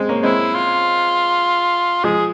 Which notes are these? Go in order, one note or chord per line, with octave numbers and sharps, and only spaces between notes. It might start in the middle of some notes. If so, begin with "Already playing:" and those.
Already playing: G#3 C4
A#3 C#4
G#3 C4 E4
F4
F3 G#3 G#4